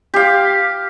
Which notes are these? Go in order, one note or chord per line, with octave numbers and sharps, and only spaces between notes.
G4 F5